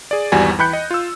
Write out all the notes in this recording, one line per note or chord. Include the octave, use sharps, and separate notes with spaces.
G#4 D5
G#1 E2 G3 F#4 G#5
E3 G5 B5 F#6 G6 C#7
D#5
F4 E6